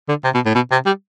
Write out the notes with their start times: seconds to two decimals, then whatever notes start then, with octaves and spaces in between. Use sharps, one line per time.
0.09 D3
0.24 C3
0.34 B2
0.45 A2
0.55 B2
0.72 C3
0.86 G3